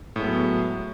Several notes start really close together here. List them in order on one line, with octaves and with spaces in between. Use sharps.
A2 G#3 B3 F#3